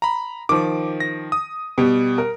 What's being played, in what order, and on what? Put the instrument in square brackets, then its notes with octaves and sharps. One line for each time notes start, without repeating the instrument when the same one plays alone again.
[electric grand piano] A#5 B5
[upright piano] D#3 F3 [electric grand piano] D6
[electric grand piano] A#6
D#6
[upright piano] B2 G3
A#4